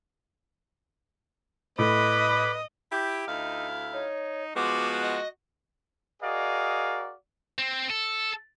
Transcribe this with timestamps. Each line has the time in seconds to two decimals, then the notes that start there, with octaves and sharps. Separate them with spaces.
1.79 A2 B4 D#5 B5 D6
2.91 E4 G4
3.27 D2 D#4 E4 F5
3.93 D#4 C#5
4.56 F3 G#3 B3 F#4 D6
5.02 D#5
6.22 F#4 G#4 A#4 D5 D#5 F5
7.58 C4
7.90 A4